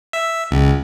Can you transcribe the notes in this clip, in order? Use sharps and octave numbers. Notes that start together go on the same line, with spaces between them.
E5
C#2